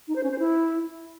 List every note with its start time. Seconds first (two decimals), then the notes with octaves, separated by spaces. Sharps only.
0.08 D#4
0.16 C5
0.23 C#4
0.31 C5
0.39 E4